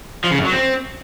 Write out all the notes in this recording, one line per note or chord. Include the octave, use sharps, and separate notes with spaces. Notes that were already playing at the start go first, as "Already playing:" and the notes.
F3
C#3
F#2
F#3
C4